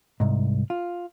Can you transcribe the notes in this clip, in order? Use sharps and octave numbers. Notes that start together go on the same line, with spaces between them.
C2 G#2
F4